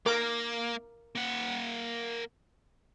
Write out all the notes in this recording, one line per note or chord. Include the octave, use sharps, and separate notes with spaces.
A#3 A#4 D6
A#3 F#5